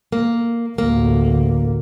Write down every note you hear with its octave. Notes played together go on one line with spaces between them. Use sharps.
A#3
A1 D2 A#3